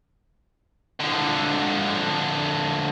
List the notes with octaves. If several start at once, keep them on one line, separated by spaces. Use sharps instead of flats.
D3 F3